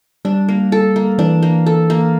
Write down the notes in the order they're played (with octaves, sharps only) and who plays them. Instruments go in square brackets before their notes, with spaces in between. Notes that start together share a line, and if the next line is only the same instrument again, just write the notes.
[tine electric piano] G3 [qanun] D4
[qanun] A#3
A4
A#3
[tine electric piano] E3 [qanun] D4
[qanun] A#3
A4
A#3